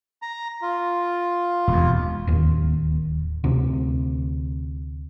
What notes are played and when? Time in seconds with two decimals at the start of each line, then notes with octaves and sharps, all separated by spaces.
0.22 A#5
0.62 F4
1.68 E1 D#2
2.27 D1 D#2
3.44 D2 C3